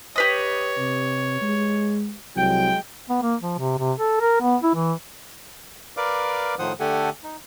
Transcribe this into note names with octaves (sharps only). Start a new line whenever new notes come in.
G4 B4 C#5 D#5
C3
G#3
C2 F#3 G#3 G5
B3
A#3
F3
C3
C3
A4
A#4
B3
E4
E3
A#4 B4 D5 F5 D6
A2 D#3 F3 C5 F#5 D#6
D3 A3 G4 A4 F#5 G#5
D#4